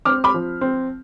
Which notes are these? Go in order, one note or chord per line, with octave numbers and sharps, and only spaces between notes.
C4 D6 F6
B5 D6
F3
C4